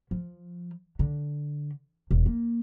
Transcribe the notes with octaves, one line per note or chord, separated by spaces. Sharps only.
F3
D3
E1
A#3